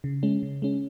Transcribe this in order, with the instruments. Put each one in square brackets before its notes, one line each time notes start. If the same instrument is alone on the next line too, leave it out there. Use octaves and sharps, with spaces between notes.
[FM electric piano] C#3
G#3 C#4
C#3
G#3 C#4